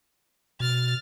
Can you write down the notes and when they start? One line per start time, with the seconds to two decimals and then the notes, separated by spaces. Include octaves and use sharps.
0.60 B2 F6 A6